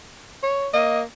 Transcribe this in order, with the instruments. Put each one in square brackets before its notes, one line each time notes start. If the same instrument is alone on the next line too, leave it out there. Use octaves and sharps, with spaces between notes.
[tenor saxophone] C#5
[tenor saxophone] A#3 [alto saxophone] D#5